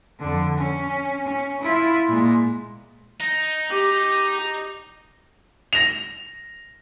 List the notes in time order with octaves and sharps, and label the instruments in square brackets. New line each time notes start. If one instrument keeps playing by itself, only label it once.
[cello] F2 D3
C#4
C#4
E4 F4
A#2 G#3
[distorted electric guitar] D#4
[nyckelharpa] G4
[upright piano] A#6 F7